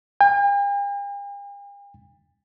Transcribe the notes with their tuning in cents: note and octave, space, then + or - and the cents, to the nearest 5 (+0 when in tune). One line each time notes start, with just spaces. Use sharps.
G5 +45